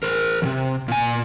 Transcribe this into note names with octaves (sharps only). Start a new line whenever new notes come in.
A#4 C5
D#2 C3
A#2 G#5